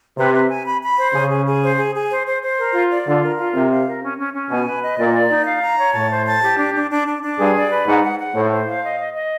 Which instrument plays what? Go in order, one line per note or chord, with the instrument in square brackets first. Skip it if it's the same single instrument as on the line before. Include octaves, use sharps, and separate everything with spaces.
[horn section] C3 [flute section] B4
[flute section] B4
G#5
B5
B5
C5
[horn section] C#3 [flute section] G#4
[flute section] G#4
G#4
C5
G#4
G#4
C5
C5
C5
A#4
F4
D5
[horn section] D3 [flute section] F4
[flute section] A#4
F4
[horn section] C3 [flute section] A#4
[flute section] F5
A#4
C#4
C#4
C#4
[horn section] B2 [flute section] G#5
[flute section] B4
D#5
[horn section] A#2 [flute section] D5
[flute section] D5
D#4
F5
A#5
C#5
[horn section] A2 [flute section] A5
[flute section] C5
A5
G4
D4
D4
D4
D4
D4
[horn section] G2 [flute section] G#4
[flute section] D5
B4
[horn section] G#2 [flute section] F#5
[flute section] F#5
F#5
[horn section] A2 [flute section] C5
[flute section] C5
F5
D#5
D#5
D#5